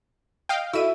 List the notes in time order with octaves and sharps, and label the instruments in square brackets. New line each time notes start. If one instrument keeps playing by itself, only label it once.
[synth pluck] D#5 F5 G5
[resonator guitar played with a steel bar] E4 [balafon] F#4 A4 D#5 [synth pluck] E6 D#7